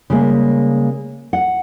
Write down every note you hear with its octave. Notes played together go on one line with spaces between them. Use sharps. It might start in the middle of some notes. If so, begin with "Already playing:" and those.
C#3 G3 G#3 A#3
F#5